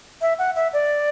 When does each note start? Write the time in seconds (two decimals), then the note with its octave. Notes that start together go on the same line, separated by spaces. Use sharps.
0.21 E5
0.39 F#5
0.56 E5
0.73 D5